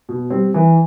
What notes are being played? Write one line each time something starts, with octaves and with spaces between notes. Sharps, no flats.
B2
G3 C4
E3